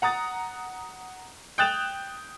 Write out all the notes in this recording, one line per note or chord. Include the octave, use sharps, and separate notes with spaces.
F#5 A#5 D#6 A6
G5 D#6 F#6 A6 E7 F7